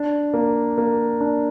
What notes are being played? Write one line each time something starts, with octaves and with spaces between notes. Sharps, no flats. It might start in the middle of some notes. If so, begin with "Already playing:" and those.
Already playing: D4
A#3
A#3
D4